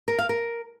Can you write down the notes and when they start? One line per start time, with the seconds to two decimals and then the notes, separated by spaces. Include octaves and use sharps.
0.08 A#4
0.18 F5
0.29 A#4